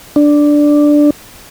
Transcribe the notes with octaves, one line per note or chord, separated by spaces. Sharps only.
D4